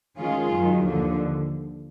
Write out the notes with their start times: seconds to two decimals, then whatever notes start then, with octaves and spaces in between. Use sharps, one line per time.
0.17 D#3 G#3 C#4 F4 G#4
0.51 F#2 D#3 F#3
0.84 D#2 D3 F3